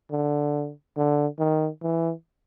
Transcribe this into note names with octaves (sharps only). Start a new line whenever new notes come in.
D3
D3
D#3
E3